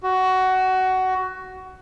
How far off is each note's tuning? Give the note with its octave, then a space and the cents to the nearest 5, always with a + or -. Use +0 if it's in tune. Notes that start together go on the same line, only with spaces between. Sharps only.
F#4 +15